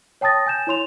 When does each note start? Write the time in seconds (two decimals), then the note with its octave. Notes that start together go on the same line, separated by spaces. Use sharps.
0.21 C#5 G5 A5 D#6 A6 A#6
0.46 G#5 G6 E7
0.67 E4 C#5 C6 F7